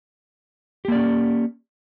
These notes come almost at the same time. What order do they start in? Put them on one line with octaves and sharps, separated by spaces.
G4 A#3 D5 C#4